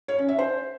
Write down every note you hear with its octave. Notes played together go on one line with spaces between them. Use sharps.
C#5
C#4
E5
C5